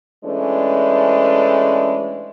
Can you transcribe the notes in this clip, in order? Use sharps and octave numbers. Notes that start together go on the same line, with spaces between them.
E3 G#3 A3 C#4 D4